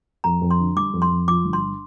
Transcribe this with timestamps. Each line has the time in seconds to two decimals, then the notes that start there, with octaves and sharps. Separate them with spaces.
0.24 F2 A#5
0.42 F2
0.51 C6
0.59 D3
0.76 G3 D6
0.94 F2
1.02 C6
1.11 F2
1.28 F3 D6
1.45 G1
1.53 C6